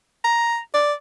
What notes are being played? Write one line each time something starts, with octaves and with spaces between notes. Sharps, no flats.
A#5
D5